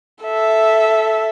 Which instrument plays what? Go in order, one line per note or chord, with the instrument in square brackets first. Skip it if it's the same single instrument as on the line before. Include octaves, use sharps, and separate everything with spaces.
[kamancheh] A4 E5